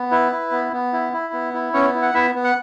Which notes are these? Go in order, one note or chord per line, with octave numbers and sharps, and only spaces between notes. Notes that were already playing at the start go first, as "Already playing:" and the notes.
Already playing: B3
E4 B4
E4
B3
B3
E4
E4
B3
E4
B3 C#4 C#5
E4
F#5
B3 E4 E5
B3
F#5